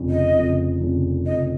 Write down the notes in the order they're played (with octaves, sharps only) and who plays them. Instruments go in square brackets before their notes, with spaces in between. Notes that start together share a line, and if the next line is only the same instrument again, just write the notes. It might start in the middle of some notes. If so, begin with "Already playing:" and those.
Already playing: [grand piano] F1 F2 C#3
[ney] D#5
[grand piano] F1 F2 C#3
F1 F2 C#3
[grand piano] F1 F2 C#3 [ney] D#5